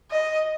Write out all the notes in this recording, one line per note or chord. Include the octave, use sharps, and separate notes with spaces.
D#5